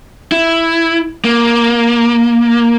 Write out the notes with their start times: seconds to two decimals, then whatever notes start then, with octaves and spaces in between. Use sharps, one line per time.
0.32 E4
1.25 A#3